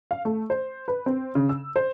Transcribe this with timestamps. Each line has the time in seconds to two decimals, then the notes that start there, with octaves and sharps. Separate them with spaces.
0.11 F5
0.25 A3
0.50 C5
0.88 B4
1.06 C4
1.35 C#3
1.49 E6
1.76 C5